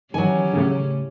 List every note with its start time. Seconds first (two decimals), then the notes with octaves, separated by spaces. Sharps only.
0.14 D#3 E3 F#3 G3 C#4 G#5
0.53 A2 C#3